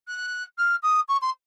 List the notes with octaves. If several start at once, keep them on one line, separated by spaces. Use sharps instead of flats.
F#6
F6
D#6
C#6
C6